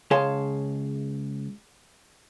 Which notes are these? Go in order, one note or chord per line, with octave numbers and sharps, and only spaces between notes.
C#2 G#4 C#5 F5 A5 C6